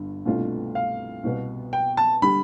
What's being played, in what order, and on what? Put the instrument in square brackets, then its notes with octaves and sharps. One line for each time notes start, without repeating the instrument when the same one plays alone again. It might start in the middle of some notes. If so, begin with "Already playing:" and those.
Already playing: [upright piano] G1 G2
C2 B2 A3 D4 F4
[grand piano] F5
[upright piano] C2 B2 B3
[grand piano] G5
A5
[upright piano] D3 G3 [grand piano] B5